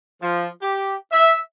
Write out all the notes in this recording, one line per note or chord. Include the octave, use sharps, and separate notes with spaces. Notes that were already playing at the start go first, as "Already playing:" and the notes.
F3
G4
E5